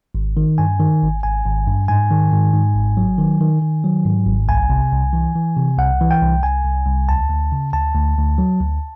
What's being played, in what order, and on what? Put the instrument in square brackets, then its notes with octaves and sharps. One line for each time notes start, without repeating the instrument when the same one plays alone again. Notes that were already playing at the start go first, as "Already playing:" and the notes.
[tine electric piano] G#1
D#3
G2 G#5
D#3
G#1
G#1 G#5
G#1
G2
G#2 G#5
D#3
G#2
G#2
G#1
F#3
D#3
D#3
D#3
F#3
G#2
G#1
C2 G#5
C3
C2
E3
E3
C3
C2 F#5
E3
G5
C2
C2 G#5
C2
C2
D2 A5
D2
C#3
D2 A5
D2
D2
F#3
D2